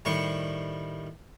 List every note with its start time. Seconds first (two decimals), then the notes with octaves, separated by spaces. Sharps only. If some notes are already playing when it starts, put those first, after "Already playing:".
0.05 A2 D#3 G3 C5 C#6